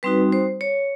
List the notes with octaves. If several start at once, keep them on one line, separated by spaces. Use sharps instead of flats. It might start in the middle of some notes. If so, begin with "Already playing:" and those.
G3 C4 D#4 F#4 B4
C5
C#5